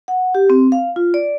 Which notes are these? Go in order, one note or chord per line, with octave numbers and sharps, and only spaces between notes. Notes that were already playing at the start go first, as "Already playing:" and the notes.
F#5
G4
C4
F5
F4
D5